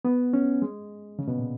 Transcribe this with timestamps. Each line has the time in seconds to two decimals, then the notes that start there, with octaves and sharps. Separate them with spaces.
0.05 B3
0.33 C#4
0.62 G#3
1.19 C#3
1.28 B2
1.38 A#2